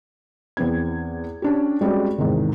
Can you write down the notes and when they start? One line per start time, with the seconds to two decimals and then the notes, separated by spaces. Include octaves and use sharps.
0.57 E2 B3 C4 G#6
1.42 C#4 D4 G4
1.81 G3 G#3 C4 C#4 F#4 D5
2.18 E2 G#2 C3 D#3